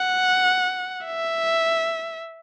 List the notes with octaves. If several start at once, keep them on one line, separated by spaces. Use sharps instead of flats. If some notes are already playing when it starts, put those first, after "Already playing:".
Already playing: F#5
E5